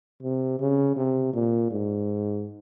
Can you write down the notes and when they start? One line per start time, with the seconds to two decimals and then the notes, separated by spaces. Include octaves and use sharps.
0.22 C3
0.60 C#3
0.96 C3
1.33 A#2
1.70 G#2